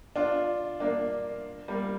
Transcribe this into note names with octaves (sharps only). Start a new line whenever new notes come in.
D4 F4
A#3 D4
G3 A#3